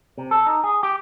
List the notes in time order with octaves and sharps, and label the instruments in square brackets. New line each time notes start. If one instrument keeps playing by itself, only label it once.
[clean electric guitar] C3
A4
D#4
G#4
G4